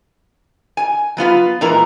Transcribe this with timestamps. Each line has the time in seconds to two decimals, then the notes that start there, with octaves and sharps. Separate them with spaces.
0.77 G#5
1.17 F#3 B3 F4 B4
1.61 A#2 E3 G#3 A#4 A#5